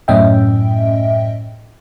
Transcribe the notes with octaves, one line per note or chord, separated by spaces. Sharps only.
F#2 A2 C#4 D#5 E5 G5